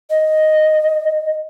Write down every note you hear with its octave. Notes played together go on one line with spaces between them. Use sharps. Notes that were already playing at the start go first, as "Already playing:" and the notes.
D#5